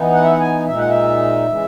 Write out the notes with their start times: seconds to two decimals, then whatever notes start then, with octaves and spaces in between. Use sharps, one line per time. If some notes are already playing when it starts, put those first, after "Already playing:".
Already playing: E3 B3 D#4
0.13 F#5
0.23 E5
0.31 F#5
0.39 G#5
0.67 A#2 G#3 D#4 E5
0.78 F#5
0.89 E5
1.47 C#3 E3 G#3